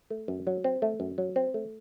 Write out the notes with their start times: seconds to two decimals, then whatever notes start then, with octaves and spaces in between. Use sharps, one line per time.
0.10 A3
0.28 F#2
0.47 F#3
0.64 C4
0.82 A3
1.00 F#2
1.18 F#3
1.36 C4
1.54 A3